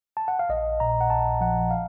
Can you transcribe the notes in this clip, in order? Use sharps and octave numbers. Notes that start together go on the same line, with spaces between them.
A5
F#5
F5
A#1 D#5
A#2 A#5
F#5
A#1 A5
F3 F#5
F5